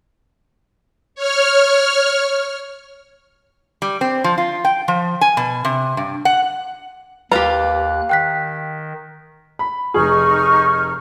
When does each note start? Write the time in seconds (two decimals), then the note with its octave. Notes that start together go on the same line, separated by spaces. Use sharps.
1.15 C#5 F6
3.82 G3
4.01 C4
4.24 F3
4.38 F4
4.65 G5
4.88 F3
5.21 G#5
5.37 B2
5.65 C3
5.97 G2
6.25 F#5
7.32 D#2 F4 G4 B4 F5 A#5 F#6
8.09 D#3 G5 F#6 B6
9.59 B5
9.94 F1 D#4 G#4 C#6 F6